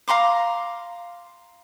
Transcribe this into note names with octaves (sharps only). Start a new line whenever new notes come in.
F5 A#5 C6 D6